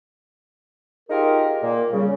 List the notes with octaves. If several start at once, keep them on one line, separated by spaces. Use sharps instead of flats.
D#4 F4 G4 G#4 A#4
A#2 A#3
C#3 G3